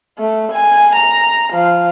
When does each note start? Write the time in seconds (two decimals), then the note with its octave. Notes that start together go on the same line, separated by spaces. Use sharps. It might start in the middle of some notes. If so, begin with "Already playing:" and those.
0.18 A3
0.52 G#5
0.95 A#5
1.53 F3